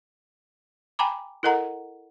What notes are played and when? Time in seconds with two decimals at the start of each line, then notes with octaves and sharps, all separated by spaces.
0.99 G5 G#5 A#5 B5 D6
1.43 E4 A4 A#4 D#5 F#5 A#5